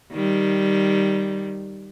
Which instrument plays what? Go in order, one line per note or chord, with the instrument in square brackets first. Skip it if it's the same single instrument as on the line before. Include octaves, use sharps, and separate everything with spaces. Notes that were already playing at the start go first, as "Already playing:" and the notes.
[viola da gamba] D#3 G3